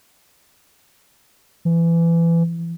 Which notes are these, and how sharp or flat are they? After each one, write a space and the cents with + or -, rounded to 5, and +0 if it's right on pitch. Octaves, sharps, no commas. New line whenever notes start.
E3 +25